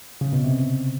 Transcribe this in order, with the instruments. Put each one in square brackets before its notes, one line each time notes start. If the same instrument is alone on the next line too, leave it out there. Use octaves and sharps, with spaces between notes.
[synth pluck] C#3
B2
C3